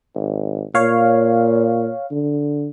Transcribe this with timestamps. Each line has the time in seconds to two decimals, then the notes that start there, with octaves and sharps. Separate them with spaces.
0.15 G#1
0.75 A#2 C#5 F5
2.11 D3